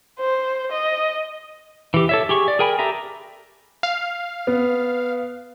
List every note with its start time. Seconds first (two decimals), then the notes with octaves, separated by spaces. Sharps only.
0.19 C5
0.72 D#5
1.94 E3 G4
2.09 A4 C#5 E5
2.29 G4 G#4 C#6
2.48 D5
2.59 G#4 A#4 G5 G#5 B5
2.79 G4 A4 E5 A#5
3.83 F5
4.47 B3